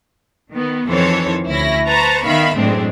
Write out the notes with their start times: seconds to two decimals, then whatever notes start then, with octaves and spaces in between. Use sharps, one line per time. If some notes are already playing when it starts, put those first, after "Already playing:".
0.51 D#3 B3
0.88 F2 D#3 E3 A4 C5 C#5
1.50 D2 C#4 E4 A#6
1.88 B4 C5 A5 A#5 C#6
2.25 D#3 B3 E5 F5 B5
2.56 F#2 A2 E3 G#3 C4 D4